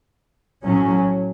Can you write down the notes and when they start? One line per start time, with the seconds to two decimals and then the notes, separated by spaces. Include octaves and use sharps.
0.63 A2 F#3 C#4